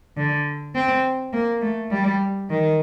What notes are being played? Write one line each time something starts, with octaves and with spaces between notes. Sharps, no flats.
D3
C4
A#3
A3
G3
D#3